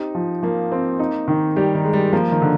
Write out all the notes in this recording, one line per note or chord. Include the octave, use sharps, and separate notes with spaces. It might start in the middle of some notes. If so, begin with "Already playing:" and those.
Already playing: C4 D#4 G4
F3
F3 A#3
C4
D#4
D#3
G3 G4
D#3
G#3
G3
F3 A#3
D#3
D3